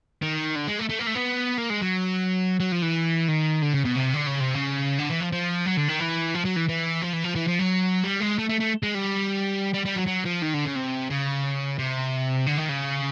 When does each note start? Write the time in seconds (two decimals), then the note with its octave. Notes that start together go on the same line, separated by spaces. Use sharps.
0.22 D#3
0.56 D3
0.67 G#3
0.79 A3
0.89 A3
0.99 A#3
1.07 A3
1.15 B3
1.58 A#3
1.70 G#3
1.81 F#3
2.60 F#3
2.72 F3
2.82 E3
3.28 D#3
3.62 D3
3.73 C#3
3.84 B2
3.95 C3
4.14 D3
4.26 C#3
4.40 C3
4.54 C#3
4.99 D3
5.09 E3
5.20 F3
5.33 F3
5.66 F#3
5.77 D3
5.88 D#3
6.00 E3
6.35 F3
6.45 F#3
6.56 E3
6.69 E3
7.02 F3
7.13 E3
7.24 F3
7.35 E3
7.47 F3
7.59 F#3
8.04 G3
8.20 G#3
8.39 A3
8.49 A3
8.60 A3
8.83 G#3
8.94 G3
9.74 G3
9.86 G3
9.96 F#3
10.07 F#3
10.25 F3
10.43 D#3
10.54 D3
10.65 C#3
10.76 C3
11.10 C#3
11.78 C3
12.46 D3
12.58 D#3
12.69 C#3